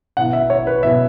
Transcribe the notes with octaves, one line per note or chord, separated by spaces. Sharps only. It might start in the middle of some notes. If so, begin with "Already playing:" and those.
B2 B3 E4 F#5
E5
C#5
B4
B2 B3 E4 E5